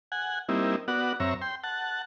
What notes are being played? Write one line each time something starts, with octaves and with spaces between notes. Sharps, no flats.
F#5 G#5
G3 A#3 C4 D#4 E4
B3 F#4 D5 F#5
F#2 C4 C#5 E5 A#5
G5 C6
F#5 A5